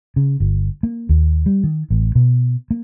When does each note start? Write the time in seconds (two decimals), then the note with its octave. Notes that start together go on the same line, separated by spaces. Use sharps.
0.16 C#3
0.40 G1
0.83 A#3
1.09 D#2
1.46 G3
1.64 D#3
1.90 A1
2.15 B2
2.71 A#3